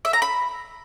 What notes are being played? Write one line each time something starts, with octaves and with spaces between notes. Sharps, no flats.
E5
A#5
B5